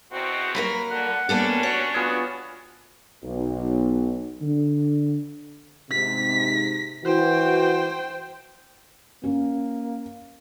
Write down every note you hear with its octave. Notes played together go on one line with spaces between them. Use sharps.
E2 B2 C4 F#4
F#3 A#3 A#4 B5
D3 F#5
G3 A#3 B3 C#4 D4 A4
F#4 C#5
B3 F4 F#4 G#4
B1
D3
G#2 C3 B6
E3 F#4 C5 G5
A#3 C#4